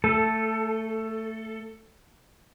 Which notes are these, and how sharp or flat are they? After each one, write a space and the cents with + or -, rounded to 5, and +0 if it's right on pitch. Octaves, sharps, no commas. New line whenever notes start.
A3 +15 A4 +0